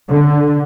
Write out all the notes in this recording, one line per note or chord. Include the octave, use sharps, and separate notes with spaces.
D3